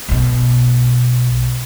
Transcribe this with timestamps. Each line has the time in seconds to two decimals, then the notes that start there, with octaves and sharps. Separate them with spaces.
0.08 B1 B2